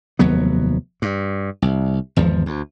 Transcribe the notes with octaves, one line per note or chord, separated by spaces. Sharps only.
F1 D#2 F#3 B3
G2
C2
G#1 E2 F3
D2